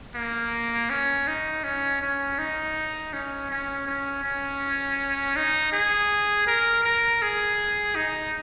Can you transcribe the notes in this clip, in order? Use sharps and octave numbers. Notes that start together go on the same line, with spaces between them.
A#3
C#4
D#4
C#4
C#4
D#4
C#4
C#4
C#4
C#4
D#4
G#4
A#4
A#4
G#4
D#4